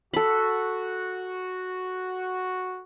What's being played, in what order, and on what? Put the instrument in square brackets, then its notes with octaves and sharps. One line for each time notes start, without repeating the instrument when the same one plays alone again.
[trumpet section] F#4 [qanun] A4 B5